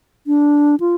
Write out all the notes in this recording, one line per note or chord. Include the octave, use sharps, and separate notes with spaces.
D4
F4